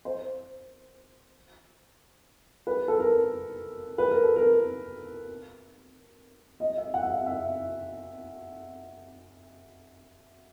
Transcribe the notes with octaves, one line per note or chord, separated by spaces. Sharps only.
C5
B4
A4
A#4
B4
A#4
A4
A#4
D#5
E5
F#5
E5
F5
E5